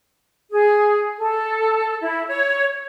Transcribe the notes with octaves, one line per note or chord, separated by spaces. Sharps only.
G#4
A4
E4
C#5